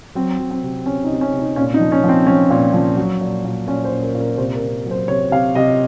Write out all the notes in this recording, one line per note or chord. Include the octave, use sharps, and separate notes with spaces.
F#3 C4
F#3
C4
C3
C3 C#4
D#4
C3
C#4
C3
D#4
A#2 C#4
D#4
F3
C#4
F3
C4
F3 C#4
A#2
F3
F#3
A#2
A#2
A#2 C#4
C5
A#2
A#4
A#2
A#4
C3 C5
A#4
C3
F#3
C5
C3 C#5
C3 F5
C3 D#5